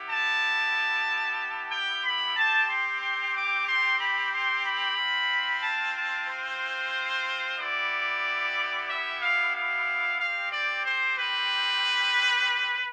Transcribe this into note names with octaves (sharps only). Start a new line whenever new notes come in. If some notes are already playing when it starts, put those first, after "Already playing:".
Already playing: B3 E4 G4
A5
G5
B5
C4 G4 A5
C6
C6
D6
C6
B5
C6
B5
C4 F4
A5
A5
C5
B3 E4 G4 D5
E5
F5
F5
C4 G4 F5
D5
C5
B4